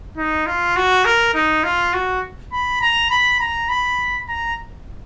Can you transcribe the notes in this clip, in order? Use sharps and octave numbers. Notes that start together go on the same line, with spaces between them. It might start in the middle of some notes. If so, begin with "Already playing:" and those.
D#4
F4
F#4
A#4
D#4
F4
F#4
B5
A#5
B5
A#5
B5
A#5